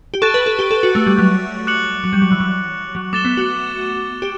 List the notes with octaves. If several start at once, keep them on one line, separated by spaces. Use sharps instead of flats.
G4
A4 C#6 F#6 A6 D7
B4
A4
G4
A4
F#4
A3
G3
F#3
D6 F#6 C#7 F#7
F#3
G3
F#3
E3
F#3
F#3
A3 D6 A6 E7 G7
B3
F#4
G4